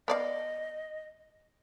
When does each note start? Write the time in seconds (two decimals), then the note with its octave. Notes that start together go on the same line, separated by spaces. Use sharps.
0.08 B3 D5 D#5 F5